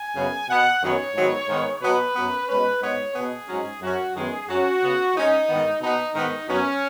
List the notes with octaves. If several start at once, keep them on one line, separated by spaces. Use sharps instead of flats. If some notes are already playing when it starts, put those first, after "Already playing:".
Already playing: G#5
F#2 C#3 B3
B2 B3 F#5
F#2 D#3 F#3 B3 C#5
G#2 D#3 F#3 B3
G#2 D#3 B3
B2 F#3 B3 B4
F#2 F#3 B3
B2 G#3 C#4 B4
G#2 G#3 B3 C#5
B2 B3 G#4
G#2 F#3 C#4
F#2 F#3 C#4 F#4
F#2 D#3 G#3 B3 G#4
F#2 F#3 C#4 F#4
C#3 B3
G#2 G#3 C#4 D#4
G#2 D#3 B3
B2 B3 D#4
G#2 D#3 B3 D#4
F#2 F#3 B3 C#4